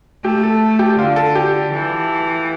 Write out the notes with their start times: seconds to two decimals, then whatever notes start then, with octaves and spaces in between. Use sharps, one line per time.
0.24 A3 G4
0.43 A4
0.79 G4
0.98 D3 F4
1.16 A4
1.35 G4
1.72 E3